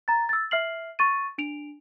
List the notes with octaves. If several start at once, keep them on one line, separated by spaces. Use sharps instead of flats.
A#5 A6
E6 A6
E5 F6 C7 F#7
C#6 A6 D#7
D4 D7 F7